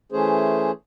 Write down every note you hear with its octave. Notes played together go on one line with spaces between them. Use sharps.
E3 A3 C#4 G#4 C5